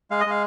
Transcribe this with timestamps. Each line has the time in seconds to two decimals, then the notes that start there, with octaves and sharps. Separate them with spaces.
0.11 G#3 F5
0.20 D#5
0.26 G#3 F5